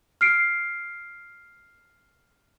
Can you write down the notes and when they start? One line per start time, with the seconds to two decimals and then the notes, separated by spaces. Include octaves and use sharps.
0.21 F6 C7 D7